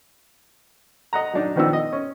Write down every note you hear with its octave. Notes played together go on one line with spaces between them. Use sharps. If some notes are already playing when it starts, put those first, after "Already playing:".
D#5 F#5 A#5
F#3 D4 D#4
D#3 F3 B3 D4 D#4 E6
D#5
C#4